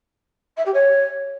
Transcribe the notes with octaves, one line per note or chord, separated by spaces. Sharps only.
E5
G4
C#5